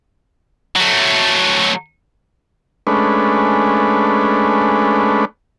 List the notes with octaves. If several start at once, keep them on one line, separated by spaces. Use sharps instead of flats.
F#3 A3
G#3 A3 C#4 D4 B4